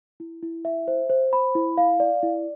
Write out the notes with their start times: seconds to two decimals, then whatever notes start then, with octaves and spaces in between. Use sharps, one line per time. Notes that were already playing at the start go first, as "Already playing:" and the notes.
0.20 E4
0.43 E4
0.65 E5
0.88 C5
1.09 C5
1.33 B5
1.55 E4
1.78 F5
2.00 D5
2.23 E4